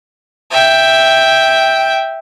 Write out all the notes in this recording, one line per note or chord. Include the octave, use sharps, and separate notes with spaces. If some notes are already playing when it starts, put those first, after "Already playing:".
E5 G5